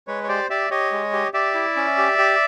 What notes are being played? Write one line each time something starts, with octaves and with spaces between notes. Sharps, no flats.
G#3 B4 C#5
C#5
G4 C5 D5
G4 D5 E5
G4 C#5 D#5
G#3
G4
G4 D5 E5
E4
C#4
G4
G4